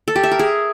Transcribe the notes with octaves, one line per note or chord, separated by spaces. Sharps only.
A4
G4
E5
A#4
G#4